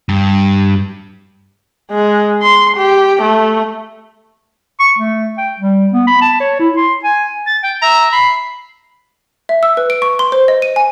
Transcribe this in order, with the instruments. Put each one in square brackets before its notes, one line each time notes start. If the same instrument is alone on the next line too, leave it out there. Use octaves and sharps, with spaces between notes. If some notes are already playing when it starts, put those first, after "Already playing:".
[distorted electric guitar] G2
[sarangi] G#3
C6
G4
A3
[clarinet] C#6
A3
G5
G3
B3
B5
A5
C#5
E4
C6
G#5
[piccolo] A6
G5
[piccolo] E5 [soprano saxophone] A#5
[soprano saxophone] B5 [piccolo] C7
[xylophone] E5
E6
B4
D7
C#6
C6
C5
D#5
D#7
G#5